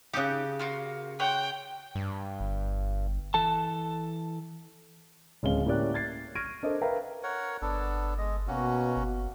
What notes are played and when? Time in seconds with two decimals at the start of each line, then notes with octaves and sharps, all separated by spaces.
0.13 C#3 D#4 G4 D#6 F#6
0.59 A#3 F4 F#4
1.20 C5 C#5 F#5 G5
1.95 G2
2.40 G1
3.34 E3 A4 A5
5.43 D1 G#3 C#4 F5 G7
5.66 A2 A#3 C#4 G4 D5 F#6
5.94 G#6 A6 C7
6.35 C#6 F6 G#6 A#6 D7 D#7
6.63 D4 A4 A#4 C5 D#5
6.81 A#4 B4 E5 F5 G5 A#5
7.23 A#4 C#5 F#5
7.62 G1 B3 D4 A4
8.18 G#3 D#5
8.48 B2 A#3 C#4 F#4
8.96 G1